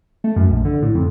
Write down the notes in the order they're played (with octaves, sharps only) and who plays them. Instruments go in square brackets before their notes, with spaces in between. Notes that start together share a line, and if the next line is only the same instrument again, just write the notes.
[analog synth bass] A3
F#2
A#1
D3
A2
F2